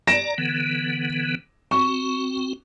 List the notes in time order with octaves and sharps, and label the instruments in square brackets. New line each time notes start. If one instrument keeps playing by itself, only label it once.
[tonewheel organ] D5 A#5 [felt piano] A#6 D7 E7
[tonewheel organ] D3 E3 B3
[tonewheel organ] C4 F#4 [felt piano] C#6